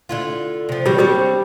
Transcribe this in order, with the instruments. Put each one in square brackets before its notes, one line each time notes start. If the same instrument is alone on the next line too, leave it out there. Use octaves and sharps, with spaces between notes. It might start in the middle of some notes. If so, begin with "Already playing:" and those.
[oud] D3 E4 F4
C3 F3
[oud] D#3 F#3 [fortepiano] G3
[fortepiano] G3 [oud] C4 D4 C#5